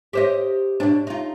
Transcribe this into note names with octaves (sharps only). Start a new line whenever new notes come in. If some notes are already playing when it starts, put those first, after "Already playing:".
G4 C5 D#5
B2 D4
D#4 F4